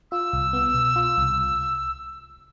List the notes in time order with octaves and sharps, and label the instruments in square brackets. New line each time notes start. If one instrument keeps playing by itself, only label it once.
[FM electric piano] F4 [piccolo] E6
[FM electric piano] C2
B3
B2
F4
C2